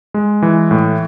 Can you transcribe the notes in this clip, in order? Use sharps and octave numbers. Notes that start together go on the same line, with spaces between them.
G#3
E3
A2